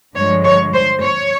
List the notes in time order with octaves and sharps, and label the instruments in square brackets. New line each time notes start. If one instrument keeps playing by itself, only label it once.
[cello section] G2 D3 F3 G#3 C#5
C#5
C5
C#5